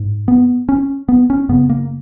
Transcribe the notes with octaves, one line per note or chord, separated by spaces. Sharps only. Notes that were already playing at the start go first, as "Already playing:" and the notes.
Already playing: G#2
B3
C#4
B3
C#4
F#2 C#3 B3
A#3